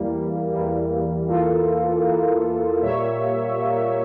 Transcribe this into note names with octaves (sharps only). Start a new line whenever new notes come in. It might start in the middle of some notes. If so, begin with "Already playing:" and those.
Already playing: E2 E3 G3 A#3
E2 E3 G3 A#3
E2 E3 A#3 F4 A4
E2 E3 A#3
A#2 G3 A#3 C#5 E5
A#2 G3 A#3